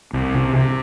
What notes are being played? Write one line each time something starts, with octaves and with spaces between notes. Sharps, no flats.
C2
C3
C3